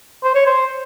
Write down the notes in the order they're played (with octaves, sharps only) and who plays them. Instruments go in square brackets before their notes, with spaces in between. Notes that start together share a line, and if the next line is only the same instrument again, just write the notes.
[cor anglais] C5
C#5
C5